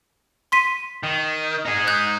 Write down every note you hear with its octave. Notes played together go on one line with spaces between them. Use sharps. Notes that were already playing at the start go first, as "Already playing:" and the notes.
C6 B6 D#7
D#3
D#4 G#4
D#6 F#6 G6